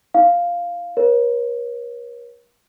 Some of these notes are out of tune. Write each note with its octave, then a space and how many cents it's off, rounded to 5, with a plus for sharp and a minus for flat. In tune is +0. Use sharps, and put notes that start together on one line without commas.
D#4 +45 F5 +0
A#4 +45 C#5 -25